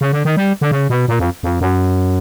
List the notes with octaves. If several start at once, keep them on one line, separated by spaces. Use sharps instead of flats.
C#3
D3
D#3
G3
D3
C#3
B2
A#2
F2
F2
F#2